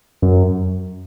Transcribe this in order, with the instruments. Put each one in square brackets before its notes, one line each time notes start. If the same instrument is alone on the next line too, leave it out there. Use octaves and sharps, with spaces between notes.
[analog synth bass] F#2